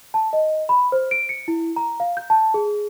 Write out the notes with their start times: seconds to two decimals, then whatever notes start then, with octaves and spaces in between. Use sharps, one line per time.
0.14 A5
0.33 D#5
0.69 B5
0.92 C5
1.11 D7
1.29 C#7
1.48 E4
1.76 A#5
2.00 F5
2.17 G6
2.30 A5
2.54 G#4